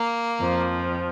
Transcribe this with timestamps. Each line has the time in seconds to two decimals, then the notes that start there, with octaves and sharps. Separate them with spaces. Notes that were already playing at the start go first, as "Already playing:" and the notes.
Already playing: A#3
0.40 F2 F3